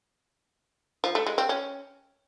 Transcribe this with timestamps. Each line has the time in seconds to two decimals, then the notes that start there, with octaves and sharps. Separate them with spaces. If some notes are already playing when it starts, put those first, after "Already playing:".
1.04 F3
1.15 A3
1.27 G#3
1.38 C4
1.49 C#4